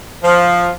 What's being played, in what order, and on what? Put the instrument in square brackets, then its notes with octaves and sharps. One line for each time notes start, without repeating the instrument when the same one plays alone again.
[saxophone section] F3